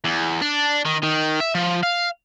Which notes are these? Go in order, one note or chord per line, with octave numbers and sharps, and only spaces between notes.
E2
D4
D#3
D#3
E5
F3
F5